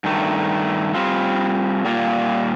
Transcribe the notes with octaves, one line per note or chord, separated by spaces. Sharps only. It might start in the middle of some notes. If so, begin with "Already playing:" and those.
G2 D#3 A3
G3 C4 F4
A#2 G3 A#3 F4